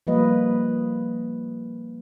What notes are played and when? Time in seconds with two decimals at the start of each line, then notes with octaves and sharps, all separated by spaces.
0.07 F3 G3 A#3 B4 D#5